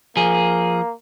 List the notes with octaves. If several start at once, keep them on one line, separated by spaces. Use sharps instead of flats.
F3 A#3 G#4